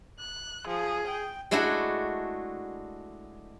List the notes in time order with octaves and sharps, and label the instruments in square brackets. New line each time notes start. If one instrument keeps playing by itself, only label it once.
[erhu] F#6
[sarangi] F3 [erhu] G#4
[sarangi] G5
[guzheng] G#3 A3 D4 E4 F#4